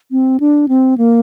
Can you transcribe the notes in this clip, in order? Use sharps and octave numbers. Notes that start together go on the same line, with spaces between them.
C4
D4
C4
A#3